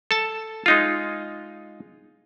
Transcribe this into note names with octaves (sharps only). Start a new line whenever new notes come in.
A4 A5
G#3 D#4 F4